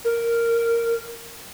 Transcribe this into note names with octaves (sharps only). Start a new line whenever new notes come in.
A#4